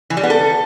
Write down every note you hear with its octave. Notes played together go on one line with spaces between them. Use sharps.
E3
G3
B3
A4